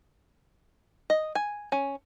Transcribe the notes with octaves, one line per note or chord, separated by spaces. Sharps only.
D#5
G#5
C#4